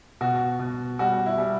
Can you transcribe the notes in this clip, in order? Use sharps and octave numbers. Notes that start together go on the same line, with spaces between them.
B2 F#4
B2
G3 F#4
E4
G3